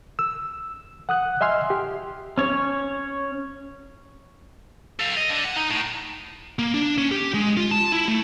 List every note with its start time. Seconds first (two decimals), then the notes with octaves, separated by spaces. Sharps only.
0.19 E6
1.09 F#5 D#6 F#6
1.41 D#5 E5 G#5 C6 F6
1.70 G4
2.38 C#4 C#5
4.99 A4 F5
5.17 D#5
5.31 D3
5.45 F#5
5.57 D#4
5.71 A2
6.59 A#3
6.74 D4
6.98 C#4
7.11 G4
7.34 G#3
7.57 F4
7.71 A5
7.92 E4
8.08 A3